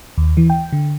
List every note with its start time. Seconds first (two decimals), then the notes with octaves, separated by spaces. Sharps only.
0.18 D#2
0.37 E3
0.50 G5
0.73 D3